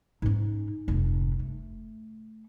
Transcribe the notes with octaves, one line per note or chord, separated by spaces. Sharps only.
G#2 C#4
F1 G#2
A3